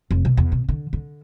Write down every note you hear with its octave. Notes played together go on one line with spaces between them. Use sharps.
F1
B2
E2
B2
D3
D3